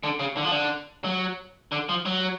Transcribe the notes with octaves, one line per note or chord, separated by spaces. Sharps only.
D3
C#3
D3
F3
D3
F#3
D3
F3
F#3